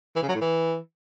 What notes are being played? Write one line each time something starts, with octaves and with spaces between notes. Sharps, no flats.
E3
C#3
F#3
A2
E3